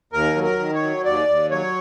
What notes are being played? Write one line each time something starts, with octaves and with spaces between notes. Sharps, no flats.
D#2 A#4
F#3
A#4
D#3
C#5
F#3
D#2 D5
D#2
F#3 C#5